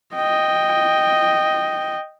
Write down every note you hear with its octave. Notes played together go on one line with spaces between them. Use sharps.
D#5 G5